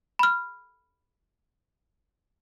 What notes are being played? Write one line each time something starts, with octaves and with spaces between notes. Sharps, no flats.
B5 F6